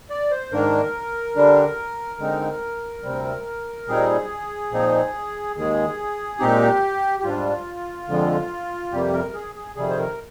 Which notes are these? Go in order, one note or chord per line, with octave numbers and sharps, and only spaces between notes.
D5
C5
G#2 D#3 A#3 D4 A#4
D3 G3 D4
D3 G#3 C4 D#4
D2 C3 G3 C4
A#2 G3 C4 D#4 G#4
A#2 F3 C4 D#4
D#2 D#3 G#3 G#4
A#2 G#3 C4 D#4 G4
G4
G#2 G3 D4 F4
F2 D3 F3 G#3
F2 C3 G3 A#3 G4
A#4
G#4
G#4
F2 C3 D#3 G3 G#4
C5
A#4